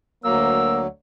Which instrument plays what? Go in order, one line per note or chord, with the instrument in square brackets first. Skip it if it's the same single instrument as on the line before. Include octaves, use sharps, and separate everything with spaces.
[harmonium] D2 F#3 [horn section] A#3 [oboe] E6